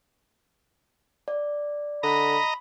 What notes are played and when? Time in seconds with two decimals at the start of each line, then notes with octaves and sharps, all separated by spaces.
1.28 D5
2.03 D3 D#5 A#5 B5